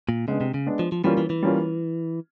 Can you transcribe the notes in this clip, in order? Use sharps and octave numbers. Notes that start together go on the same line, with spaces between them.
A#2
C#3 G#3 B3 D4
C3
C#3
G#3 B3 D4
F3
F3
E3 G3 A#3 C#4 F4
E3
E3
G3 A#3 C#4 F4